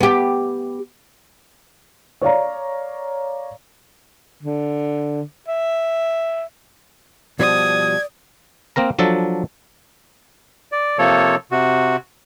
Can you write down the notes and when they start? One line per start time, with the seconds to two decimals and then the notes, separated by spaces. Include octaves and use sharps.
0.01 B3 G4
2.21 C#5 D5 F5 A#5
4.43 D3
5.48 E5
7.39 B2 F3 G3 D5 D#6 G#6
8.76 A#3 C4 A#4 A#5
8.99 F3 F#3 D4 A4
10.72 D5
10.98 C3 F3 A#3 A4 C#5
11.51 C3 F#4